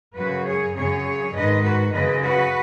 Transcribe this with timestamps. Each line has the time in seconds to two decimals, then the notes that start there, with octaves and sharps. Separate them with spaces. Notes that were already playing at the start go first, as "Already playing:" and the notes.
0.17 F#2 C#3 F#4 B4
0.46 G#4 C#5
0.75 F#2 C#3 G#4 C#5
1.34 G#2 D#3 B4 D#5
1.63 F#4 B4
1.93 F#2 C#3 B4 D#5
2.22 F#4 B4